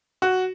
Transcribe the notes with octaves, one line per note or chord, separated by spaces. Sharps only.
F#4